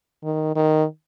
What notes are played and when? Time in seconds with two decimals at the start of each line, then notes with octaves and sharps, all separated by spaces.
0.23 D#3
0.56 D#3